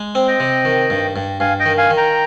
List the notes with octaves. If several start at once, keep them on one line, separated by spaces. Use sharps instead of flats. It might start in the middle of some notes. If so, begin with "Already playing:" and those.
Already playing: G#3
C4
D#5 G5
C3
D#3
G2
G2
G2 F5 G#5
D#5 G5
D#3
F5 G#5
D#3
G5 A#5